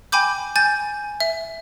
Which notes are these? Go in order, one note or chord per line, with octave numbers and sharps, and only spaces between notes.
G5 G#5 B5 D6 G6
G#5 G6 A6
E5